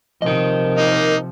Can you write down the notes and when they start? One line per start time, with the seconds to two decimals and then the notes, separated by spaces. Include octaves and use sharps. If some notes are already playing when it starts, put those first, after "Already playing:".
0.22 C3 F3 A#4 D#5
0.78 A#3 D#4